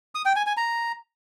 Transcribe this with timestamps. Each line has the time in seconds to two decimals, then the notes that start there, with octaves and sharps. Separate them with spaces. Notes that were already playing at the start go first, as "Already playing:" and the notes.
0.15 D#6
0.25 G5
0.36 G#5
0.47 G#5
0.57 A#5